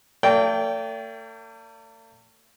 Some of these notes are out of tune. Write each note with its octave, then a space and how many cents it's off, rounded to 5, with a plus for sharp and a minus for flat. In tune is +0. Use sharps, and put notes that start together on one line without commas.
A3 +45 D5 -35 G5 -10